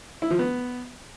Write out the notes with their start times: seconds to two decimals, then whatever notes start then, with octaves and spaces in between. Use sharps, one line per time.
0.22 E4
0.30 F3
0.39 B3